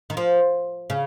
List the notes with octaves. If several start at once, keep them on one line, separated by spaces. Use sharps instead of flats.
D#3
F3
C#3